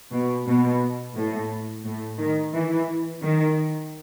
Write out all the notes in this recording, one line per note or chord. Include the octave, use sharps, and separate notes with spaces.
B2
B2
A2
A2
D#3
E3
D#3